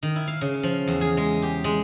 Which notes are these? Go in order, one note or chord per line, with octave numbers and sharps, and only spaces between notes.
D#3
E4
F5
C#3
F3
E2
G#4
G#3
G4
G#3